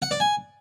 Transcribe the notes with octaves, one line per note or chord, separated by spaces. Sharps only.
F#5
D5
G#5